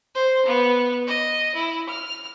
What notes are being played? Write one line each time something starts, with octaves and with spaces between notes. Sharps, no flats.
C5
B3
D#5
E4
F6